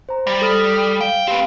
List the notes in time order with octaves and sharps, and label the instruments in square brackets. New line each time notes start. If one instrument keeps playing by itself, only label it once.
[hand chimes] C5 A#5
[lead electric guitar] G3 [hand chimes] A6 A#6
[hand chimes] A4 D#6 F6
[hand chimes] F5 [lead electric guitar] G5
[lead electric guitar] C4 B4 [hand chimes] G4 F5 B5